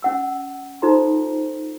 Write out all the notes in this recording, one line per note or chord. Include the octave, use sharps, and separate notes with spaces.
C#4 F#5 E6
D#4 F4 A4 C5 A#5 C6